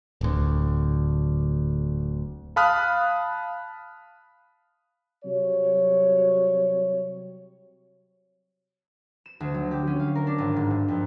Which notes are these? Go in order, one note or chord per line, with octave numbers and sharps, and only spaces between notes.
D1 D2
F5 A5 B5 D#6 F6 F#6
C3 F#3 G3 C#5
E7
D2
F#3
G4
C#4
F5
A#4
D4
G#1
G#2
G2
F2